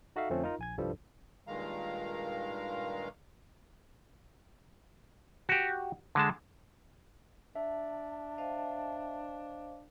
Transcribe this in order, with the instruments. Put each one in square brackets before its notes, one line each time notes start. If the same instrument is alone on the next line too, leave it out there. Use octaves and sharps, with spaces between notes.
[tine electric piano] D#4 F#4 A4 E5 F5
F2 D3 F3 A3 C4 C#4
D#4 F4 A#4 A#5
A#1 G#5 G#6
C2 G2 F3 G3 A4
[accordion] G2 A#2 D#3 G#3 F5 A#5
[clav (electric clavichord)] F#4 G4
D3 G#3 A5
[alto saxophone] D4 [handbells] E5 [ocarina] A5
[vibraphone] C5 D#5 F5